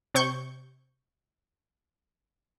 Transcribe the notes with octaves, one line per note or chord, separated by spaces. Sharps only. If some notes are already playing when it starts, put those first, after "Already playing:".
C3 C5 C#6 G6